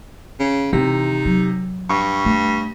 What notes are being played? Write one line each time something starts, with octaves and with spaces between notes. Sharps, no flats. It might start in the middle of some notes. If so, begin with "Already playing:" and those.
C#3
C3 E3 D#4
F#3
G2 C#6
A3